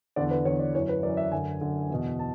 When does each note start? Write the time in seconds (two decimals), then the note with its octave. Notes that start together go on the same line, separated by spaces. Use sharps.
0.16 E2 D3 D5
0.31 B4
0.45 E2 D3 C#5
0.59 D5
0.75 F#2 E3 C#5
0.89 B4
1.03 F#2 E3 D5
1.17 E5
1.32 F#2 D3 G#5
1.61 F#2 D3
1.90 E2 B2
2.19 A5